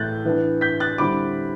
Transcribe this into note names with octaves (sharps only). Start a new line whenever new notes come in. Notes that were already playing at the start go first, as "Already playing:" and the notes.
Already playing: A2 E3 A3 F#6 G6 A6
E3 B3 D4
G6 B6
F#6 A6
D3 G3 C4 E4 B5 D6